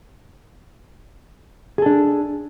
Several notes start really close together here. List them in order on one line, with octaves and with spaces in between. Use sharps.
G#4 A4 D4